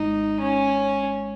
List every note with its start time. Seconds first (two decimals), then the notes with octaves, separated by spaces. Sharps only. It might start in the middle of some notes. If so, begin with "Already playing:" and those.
Already playing: G#1 D#4
0.40 C#4